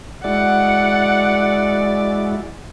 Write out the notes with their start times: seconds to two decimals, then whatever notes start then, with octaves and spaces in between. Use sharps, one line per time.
0.24 G#3 E4 F#4 D5 F#5